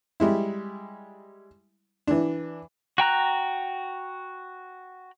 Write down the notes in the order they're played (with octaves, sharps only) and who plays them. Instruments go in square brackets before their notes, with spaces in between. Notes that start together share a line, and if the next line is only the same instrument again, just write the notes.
[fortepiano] G3 G#3 E4
E3 D4
[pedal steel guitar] F#4 G5 A#5 F#6